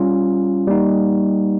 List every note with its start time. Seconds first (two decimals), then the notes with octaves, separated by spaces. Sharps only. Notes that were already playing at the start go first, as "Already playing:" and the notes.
Already playing: G3 C#4 F4
0.67 G3 A#3 D#4